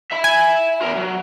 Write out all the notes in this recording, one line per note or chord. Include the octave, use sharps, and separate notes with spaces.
E5 B5
G#5
E2 A#4
F#3